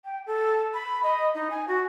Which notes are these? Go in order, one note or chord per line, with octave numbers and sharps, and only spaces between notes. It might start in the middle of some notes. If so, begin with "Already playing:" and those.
G5
A4
B5
D#5
D#4
G#5
F#4